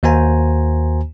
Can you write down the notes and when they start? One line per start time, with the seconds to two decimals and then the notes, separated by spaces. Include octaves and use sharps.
0.03 D#2 A#3 F#4 C5 G#5 A#5